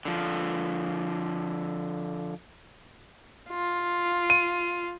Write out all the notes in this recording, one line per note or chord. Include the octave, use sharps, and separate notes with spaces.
D3 F3
F4
D#7